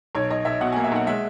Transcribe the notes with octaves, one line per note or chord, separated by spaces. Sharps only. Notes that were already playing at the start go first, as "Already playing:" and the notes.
B1 C#5
B1 D#5
B1 E5
B2 F#5
A#3 G#5
E5
B1 F#5
G#3 E5